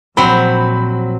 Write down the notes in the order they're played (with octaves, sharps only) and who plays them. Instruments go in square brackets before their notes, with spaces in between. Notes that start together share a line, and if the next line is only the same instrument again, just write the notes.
[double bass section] A#1 [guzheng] F#3 C4 [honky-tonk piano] B5